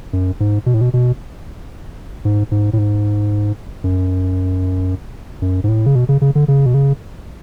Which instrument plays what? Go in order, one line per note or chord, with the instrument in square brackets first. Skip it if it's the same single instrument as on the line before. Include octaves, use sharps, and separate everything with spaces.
[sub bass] F#2
G#2
B2
A2
B2
B2
G#2
G#2
A2
G#2
F#2
F#2
G#2
A2
C#3
B2
C#3
C#3
D3
C#3
B2
C#3